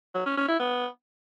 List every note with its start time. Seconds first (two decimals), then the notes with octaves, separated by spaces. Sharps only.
0.15 F#3
0.26 C#4
0.37 C#4
0.48 E4
0.60 B3